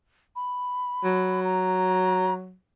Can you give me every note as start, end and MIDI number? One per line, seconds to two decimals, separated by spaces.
0.36 1.40 83
1.04 2.54 54
1.44 2.33 82